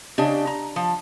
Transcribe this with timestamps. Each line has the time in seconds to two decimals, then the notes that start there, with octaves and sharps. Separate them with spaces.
0.18 C#3 D4 G4 D#5
0.47 A#5
0.76 F3